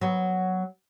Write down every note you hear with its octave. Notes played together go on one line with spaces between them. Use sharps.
F#3 B3